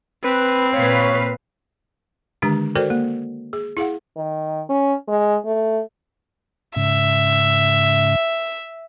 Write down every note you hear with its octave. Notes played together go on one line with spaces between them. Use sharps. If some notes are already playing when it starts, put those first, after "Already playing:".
C4 B4
A#2 B4 C#5 F5
D3 D#3 G#3 D4 G4
F#4 A4 A#4 C5 D5 G5
A#3
G#4
E4 G#4 F5 F#5
D#3
C#4
G#3
A3
G#2 C#3 E5